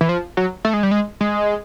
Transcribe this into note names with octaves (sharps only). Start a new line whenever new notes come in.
E3
F3
F#3
A3
G#3
G3
G#3
G#3